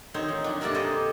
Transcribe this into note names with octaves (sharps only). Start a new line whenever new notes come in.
D#3 C4 D#4 C5 C#5
F3
D#3 F#3 D4
G2 C3 A#3 A4 D5 A5
G4 A4 C5 D#5 G#5